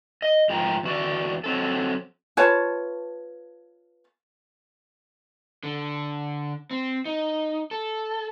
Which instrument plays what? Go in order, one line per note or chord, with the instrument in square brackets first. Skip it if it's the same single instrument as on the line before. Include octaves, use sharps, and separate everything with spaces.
[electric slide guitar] D#5
G#2 F3 F4 A#4 G5 A#5
E2 F#4 D5
F#3 C4 A4
[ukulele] F4 B4 C#5 A5
[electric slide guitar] D3
C4
D#4
A4